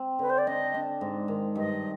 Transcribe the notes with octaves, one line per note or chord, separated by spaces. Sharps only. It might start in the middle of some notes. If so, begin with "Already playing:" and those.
Already playing: C4
D3 B4
C5
D5
D4 D#5
D4
G#2
D#3
G2 D#5